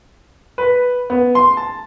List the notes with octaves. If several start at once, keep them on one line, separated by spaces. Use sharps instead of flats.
B4
B3
C6
A5